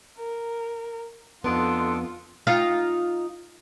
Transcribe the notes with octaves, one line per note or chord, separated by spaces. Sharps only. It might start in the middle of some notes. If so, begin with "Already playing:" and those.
A#4
F2 B3 D4 D#4 F4 A4 C6
D#4 F4 F5